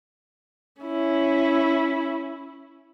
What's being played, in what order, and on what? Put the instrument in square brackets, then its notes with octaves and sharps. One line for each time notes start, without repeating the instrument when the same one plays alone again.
[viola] C#4 E4